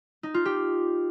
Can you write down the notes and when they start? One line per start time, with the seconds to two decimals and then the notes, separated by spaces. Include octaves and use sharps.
0.23 D#4
0.34 F4
0.45 G4